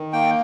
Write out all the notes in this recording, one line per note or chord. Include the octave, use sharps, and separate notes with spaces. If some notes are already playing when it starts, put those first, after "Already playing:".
Already playing: D#3
A#3 G5